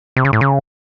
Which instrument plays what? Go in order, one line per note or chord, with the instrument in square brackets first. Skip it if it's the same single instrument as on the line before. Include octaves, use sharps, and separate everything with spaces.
[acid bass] C3
C#3
A2
C#3